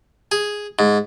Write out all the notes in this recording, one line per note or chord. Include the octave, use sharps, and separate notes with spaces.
G#4
G#2